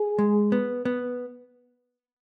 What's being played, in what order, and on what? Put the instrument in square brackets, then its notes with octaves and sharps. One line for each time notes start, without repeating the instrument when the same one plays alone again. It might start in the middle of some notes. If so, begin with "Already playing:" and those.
Already playing: [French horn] G#4
[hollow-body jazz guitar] G#3
B3
B3